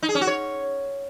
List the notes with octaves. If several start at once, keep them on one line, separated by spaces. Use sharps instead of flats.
D#4
G#4
C#4
F#4
C#5